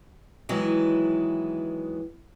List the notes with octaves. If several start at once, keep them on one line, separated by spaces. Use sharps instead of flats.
D#3 E3 F#3 G#3 B3 E4